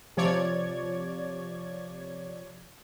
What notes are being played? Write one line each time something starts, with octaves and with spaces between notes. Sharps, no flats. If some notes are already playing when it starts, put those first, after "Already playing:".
C3 F3 C#5 D5 G#6